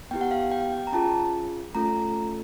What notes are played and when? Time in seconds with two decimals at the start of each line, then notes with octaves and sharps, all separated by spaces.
0.11 B3 E4 G4 G5
0.21 F#5
0.31 F5
0.52 G5
0.72 G5
0.87 A#5
0.92 C#4 F4 G#4 A5
1.75 A3 C#4 F4 A4 A#5